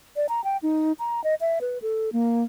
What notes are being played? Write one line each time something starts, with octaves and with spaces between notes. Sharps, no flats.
D5
A#5
G5
D#4
A#5
D#5
E5
B4
A4
A#3